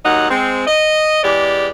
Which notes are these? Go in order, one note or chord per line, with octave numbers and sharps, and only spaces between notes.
D#2 F#3 D#4 D#5 F#5
G#3 C4
D#5
E2 G#3 G4 D5